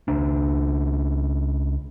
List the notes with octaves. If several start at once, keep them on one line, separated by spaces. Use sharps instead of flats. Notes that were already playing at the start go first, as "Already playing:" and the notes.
C#2 D4